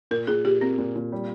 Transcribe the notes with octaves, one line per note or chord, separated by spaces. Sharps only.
A#2 A#4
A#2 G#4
A#2 G4
A#3 C4
A#2
A#2
G3